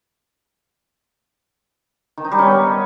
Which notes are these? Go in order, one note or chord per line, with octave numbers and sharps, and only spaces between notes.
D#3
D#4
G3
C#4
B3